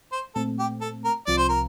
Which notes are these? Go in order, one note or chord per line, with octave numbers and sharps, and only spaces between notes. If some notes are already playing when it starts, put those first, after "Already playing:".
C5
A#2 A3 C4 A4
G4
A4
A#4
C2 C3 F3 C4 F4 D5
C5
A#4